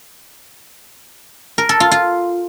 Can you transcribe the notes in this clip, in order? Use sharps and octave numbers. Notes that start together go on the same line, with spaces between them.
A#4
A4
F4
F4